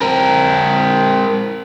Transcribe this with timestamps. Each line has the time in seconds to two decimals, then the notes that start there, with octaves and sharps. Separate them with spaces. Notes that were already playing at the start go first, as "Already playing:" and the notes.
0.01 C4 A#4